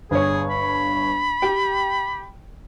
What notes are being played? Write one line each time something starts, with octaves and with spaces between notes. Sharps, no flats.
G1 G#4 C#5
B5
G4 G5